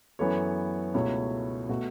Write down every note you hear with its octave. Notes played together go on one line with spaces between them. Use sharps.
F#2 E3 B3 A4 C#5
C#2 B2 A3 E4 C#5
B2 A3 F#4